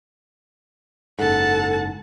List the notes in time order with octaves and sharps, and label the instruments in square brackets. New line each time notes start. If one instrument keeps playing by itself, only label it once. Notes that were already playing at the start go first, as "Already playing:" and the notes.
[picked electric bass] F#1 G#2 [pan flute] A4 [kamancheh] F#5 A5